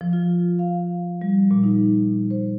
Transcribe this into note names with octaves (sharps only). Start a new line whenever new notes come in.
F3
F4
F5
G3
A#2
D#4
C5